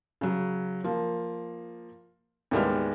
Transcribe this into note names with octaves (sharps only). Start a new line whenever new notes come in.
C#3 F#3
F3 A#3
D#2 A2 G3 G#3 B3 F6